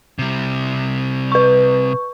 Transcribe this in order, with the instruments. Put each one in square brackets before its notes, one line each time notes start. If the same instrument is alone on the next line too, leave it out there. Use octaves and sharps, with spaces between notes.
[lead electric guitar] C3 G3
[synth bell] B4 C#6